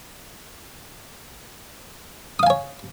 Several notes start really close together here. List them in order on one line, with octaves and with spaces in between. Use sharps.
D#6 F5 G#5 C#5